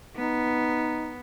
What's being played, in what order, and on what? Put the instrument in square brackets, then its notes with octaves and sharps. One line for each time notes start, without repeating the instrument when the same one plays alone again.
[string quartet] B3 [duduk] D#4